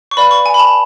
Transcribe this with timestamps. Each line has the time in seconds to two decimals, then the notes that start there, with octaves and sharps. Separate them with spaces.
0.11 C#6
0.17 B4 D5 F5 B5
0.31 C#6
0.46 G#5
0.54 B5
0.59 A5